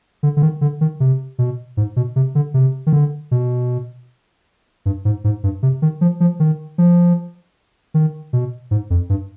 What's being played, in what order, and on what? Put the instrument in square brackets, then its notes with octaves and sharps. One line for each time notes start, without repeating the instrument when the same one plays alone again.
[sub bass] D3
D3
D#3
D3
D#3
C3
B2
G#2
B2
C3
D3
C3
D#3
D3
B2
G2
G#2
G#2
G2
C3
D#3
F3
F3
D#3
F3
D#3
B2
G#2
F2
G2